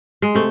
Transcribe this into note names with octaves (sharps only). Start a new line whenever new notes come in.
G#3
C3 A3